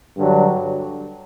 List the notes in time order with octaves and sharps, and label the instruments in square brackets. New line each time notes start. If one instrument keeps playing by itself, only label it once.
[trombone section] G2 D3 F#3